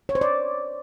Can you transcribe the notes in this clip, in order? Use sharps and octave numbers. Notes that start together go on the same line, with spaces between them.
C#5
C5
D5